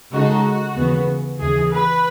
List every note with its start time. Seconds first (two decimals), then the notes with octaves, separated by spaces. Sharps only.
0.13 C#3 G#3 D#4 F#4 A4
0.76 D#2 C#3 E3 B3
1.38 D#2 C#3 E3 G#4
1.70 B4